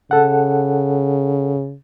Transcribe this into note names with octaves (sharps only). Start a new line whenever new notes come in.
C#3 A4 F#5